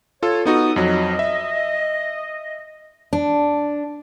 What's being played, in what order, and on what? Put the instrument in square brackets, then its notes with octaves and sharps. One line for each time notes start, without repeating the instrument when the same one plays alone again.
[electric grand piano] F4 A4 [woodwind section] C#5
[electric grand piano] B3 D#4 F#4 [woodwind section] A4 D#6
[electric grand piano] F2 F#3 [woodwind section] D#5
[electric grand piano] E5
[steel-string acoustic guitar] D4